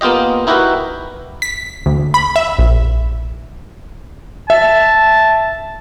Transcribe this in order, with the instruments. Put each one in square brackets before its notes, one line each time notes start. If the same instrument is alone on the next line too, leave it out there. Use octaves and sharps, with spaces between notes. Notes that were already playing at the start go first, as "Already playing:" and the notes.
[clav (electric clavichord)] A#3 B3 F4 G4 D#5
D#4 E4 F#4 G4 A#4 B4
[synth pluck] B6
D2
B5
E5
A#1
[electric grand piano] E5 [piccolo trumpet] A5